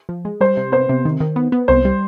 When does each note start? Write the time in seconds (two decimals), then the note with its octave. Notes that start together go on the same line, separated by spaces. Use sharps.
0.09 F3
0.25 G#3
0.41 G3 C5
0.57 C3
0.72 B3 C5
0.89 C3
1.05 D#3
1.20 D#3
1.36 B3
1.52 B3
1.68 C2 C5
1.85 G3